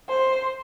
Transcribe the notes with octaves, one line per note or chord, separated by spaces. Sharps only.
C5